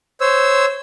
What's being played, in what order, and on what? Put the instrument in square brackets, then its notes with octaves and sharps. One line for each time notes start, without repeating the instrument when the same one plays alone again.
[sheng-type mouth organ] C5 C#5 E6